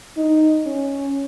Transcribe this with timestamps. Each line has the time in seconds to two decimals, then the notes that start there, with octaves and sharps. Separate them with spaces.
0.17 D#4
0.66 C#4